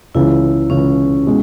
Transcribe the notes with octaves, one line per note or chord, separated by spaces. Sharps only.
C#2 C#3 E3 E4
C#2 C#3 E3 C#4
B2 G#3